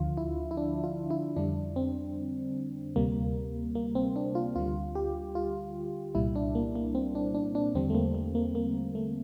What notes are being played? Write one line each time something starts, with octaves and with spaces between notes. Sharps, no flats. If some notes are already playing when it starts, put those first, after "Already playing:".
Already playing: D2 D3 F3 F4
E4
E4
D4
F4
E4
F2 D3 G3 D4
C4
D2 C3 G3 A#3
A#3
C4
D4
F4
D2 D3 G3 F4
G4
F4
C2 A#2 G3 E4
D4
A#3
A#3
C4
D4
D4
D4
E2 D3 G3 C4
A3
A#3
A3
A#3
A#3
A3